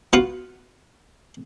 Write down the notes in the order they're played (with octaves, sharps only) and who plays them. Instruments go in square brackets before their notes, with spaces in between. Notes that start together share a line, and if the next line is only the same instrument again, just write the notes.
[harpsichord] B3 F4 F#4